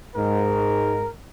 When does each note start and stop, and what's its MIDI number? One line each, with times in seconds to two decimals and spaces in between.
0.16 1.03 44
0.16 1.09 70